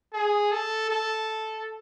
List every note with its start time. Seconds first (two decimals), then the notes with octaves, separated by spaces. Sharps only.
0.13 G#4
0.52 A4
0.89 A4